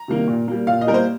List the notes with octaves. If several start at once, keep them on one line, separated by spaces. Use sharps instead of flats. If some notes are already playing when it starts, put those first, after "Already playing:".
Already playing: A#5
C3 D#3 G3 A#3
A#2
G3 A#3
A#2 F5
D#5
G3 A#3 A#4 C5